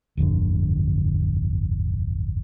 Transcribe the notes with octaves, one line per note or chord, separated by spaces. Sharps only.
D1 G1 F2 D3